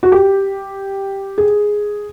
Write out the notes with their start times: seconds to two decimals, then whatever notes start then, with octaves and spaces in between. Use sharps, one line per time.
0.03 F#4
0.12 G4
1.38 G#4